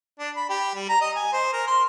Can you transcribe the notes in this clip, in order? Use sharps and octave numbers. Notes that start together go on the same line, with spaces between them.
D4
B5
G4
G3
A#5
D#5
G#5
C5
A#4
C6